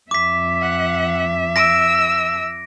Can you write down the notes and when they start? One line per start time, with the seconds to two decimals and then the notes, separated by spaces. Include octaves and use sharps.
0.11 F2 E5 D6 B6
0.62 F#5
1.56 E6 A#6 D7